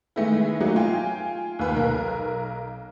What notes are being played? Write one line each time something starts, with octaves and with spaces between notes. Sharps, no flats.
D#3 G#3 A3 B3 E4
F#3 A3 A#3 D#4 F#4
F4 G5 G#5
D#2 B4
B1 A#4